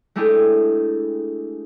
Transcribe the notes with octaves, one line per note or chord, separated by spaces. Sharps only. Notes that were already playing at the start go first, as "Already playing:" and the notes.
G#3 A3 D4 E4 G4 G#4